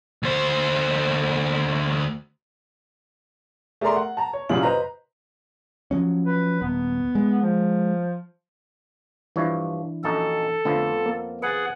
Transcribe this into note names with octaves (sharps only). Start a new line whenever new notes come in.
D2 C5
A3 G#4 A#4 D5 A#5 C6
F#5
A5 A#5
C#5
C2 F#2 A#2 C#3 F#3 F#7
B4 C5 D#5 A#5
F3 F#3 C#4
B4
D#1 B3
G#3
F3
G2 E3 F3 D4 E4 C#5
A#1 F#2 D#4 A4
F2 D3 F3 A3 B3
A#3
G#4 B4 F#5 A6